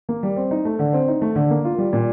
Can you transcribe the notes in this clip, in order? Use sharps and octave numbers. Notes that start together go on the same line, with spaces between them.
A#3
G3
C4
D#4
A3
D3
C4
D#4
A3
D3
A#3
F4
G3
A#2